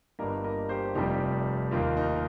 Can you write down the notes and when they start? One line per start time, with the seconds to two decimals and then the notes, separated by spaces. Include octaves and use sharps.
0.19 G1 G2 G3 A#3 A#4 D#5
0.44 A#4 D#5
0.69 G4 C5
0.95 F1 F2 C3 G3 D#4 G4
1.71 D#2 D#3 A#3 F4
1.97 D#4